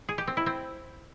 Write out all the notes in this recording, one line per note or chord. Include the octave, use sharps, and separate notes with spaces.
G#4
G4
C4
E4
C4